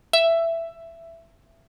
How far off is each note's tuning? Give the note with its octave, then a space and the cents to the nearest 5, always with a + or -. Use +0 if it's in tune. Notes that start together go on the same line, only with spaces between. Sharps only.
E5 +10